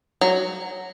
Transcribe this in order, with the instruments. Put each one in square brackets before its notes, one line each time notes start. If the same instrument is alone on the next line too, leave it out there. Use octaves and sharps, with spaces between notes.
[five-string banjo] F#3